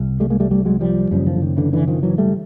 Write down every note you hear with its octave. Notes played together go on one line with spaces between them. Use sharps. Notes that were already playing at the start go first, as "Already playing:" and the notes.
Already playing: C2
G3 A3
G#3 A#3
G3 A3
G3 A3
F#3 G#3
F3 G3
F#1 F#2 C#3 F3 G3
D#3 F3
D3
D#3
D3 E3
D3 E3
D#3 F3
E3 F#3
G3 A3